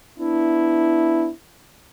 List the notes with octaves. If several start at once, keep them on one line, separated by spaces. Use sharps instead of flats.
B3 D4 E4